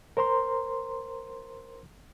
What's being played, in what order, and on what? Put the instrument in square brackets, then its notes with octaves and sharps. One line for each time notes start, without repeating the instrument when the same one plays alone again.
[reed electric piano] A#4 C5 A#5 C6